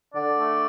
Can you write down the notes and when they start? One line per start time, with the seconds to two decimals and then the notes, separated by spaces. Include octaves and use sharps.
0.14 D3 D5
0.39 A3